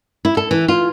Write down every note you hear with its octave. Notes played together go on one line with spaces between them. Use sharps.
E4
A4
E3
F4